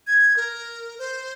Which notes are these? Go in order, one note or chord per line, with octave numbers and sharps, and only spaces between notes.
G#6
A#4
C5